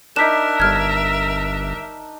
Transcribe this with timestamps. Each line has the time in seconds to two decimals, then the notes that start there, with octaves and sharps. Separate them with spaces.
0.16 D4 D#4 A#4 E5 B6 E7
0.60 G1 F6 G#6